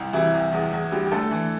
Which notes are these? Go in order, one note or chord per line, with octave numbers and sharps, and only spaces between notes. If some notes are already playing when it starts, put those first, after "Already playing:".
Already playing: C2
C3 E3 E4
C2
E2
E2
D3 G3 G4
G4
D3 A3 A4
E3